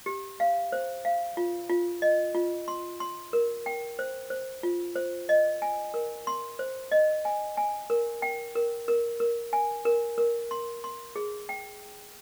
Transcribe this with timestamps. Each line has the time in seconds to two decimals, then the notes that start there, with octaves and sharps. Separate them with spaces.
0.06 G4
0.40 F5
0.72 C5
1.05 F5
1.37 F4
1.70 F4
2.02 D#5
2.34 F4
2.68 C6
3.00 C6
3.33 A#4
3.66 G5
3.99 C5
4.30 C5
4.63 F4
4.95 C5
5.29 D#5
5.62 G#5
5.94 A#4
6.27 C6
6.59 C5
6.91 D#5
7.25 G#5
7.57 G#5
7.90 A#4
8.22 G5
8.56 A#4
8.88 A#4
9.20 A#4
9.53 G#5
9.85 A#4
10.18 A#4
10.51 C6
10.84 C6
11.16 G#4
11.49 G5